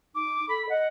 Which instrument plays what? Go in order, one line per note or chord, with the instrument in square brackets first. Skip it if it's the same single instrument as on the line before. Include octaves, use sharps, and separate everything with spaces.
[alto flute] D#4 [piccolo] D6
[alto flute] A4 [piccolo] B5
[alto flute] D#5 [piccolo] F#5